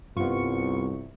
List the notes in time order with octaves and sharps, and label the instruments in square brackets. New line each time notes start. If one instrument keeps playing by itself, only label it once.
[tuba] C2 [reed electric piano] G2 G3 [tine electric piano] B3 F4 [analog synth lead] C#6